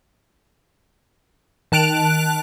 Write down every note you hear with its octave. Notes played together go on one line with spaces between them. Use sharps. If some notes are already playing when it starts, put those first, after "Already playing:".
D#3 A5 F#6 D7 F7